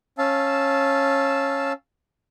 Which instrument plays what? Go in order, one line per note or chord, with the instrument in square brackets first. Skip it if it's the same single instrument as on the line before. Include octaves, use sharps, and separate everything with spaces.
[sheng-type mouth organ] C#4 F5 A5 E6